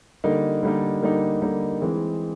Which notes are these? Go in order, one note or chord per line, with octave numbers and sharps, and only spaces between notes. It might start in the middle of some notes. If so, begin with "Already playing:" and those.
D3 G3 A#3 D#4
D3 G3 A#3 D#4
D3 G3 A#3 D#4
D3 G3 A#3 D#4
E3 G#3 C4